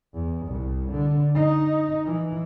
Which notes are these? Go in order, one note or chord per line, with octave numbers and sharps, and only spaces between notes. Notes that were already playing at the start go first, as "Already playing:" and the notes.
E2
C2
D3
D#4
E3